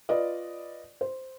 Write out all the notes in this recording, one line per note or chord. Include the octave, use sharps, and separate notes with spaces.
F4 B4 D5 D#5
C5